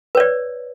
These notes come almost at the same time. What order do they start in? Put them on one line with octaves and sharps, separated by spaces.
B4 C#5 D5